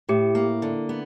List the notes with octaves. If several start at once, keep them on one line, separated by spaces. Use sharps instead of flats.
A2 G4
A#3
D3
B3